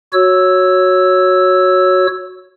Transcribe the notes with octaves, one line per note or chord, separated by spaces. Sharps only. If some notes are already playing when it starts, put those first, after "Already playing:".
F#4 C#5 E6